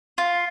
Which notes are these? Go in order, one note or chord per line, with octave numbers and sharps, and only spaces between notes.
F4